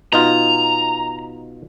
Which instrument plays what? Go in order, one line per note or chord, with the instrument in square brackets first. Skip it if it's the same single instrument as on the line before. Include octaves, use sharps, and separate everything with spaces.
[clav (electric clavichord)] B2 D#4 F4 [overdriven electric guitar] A#5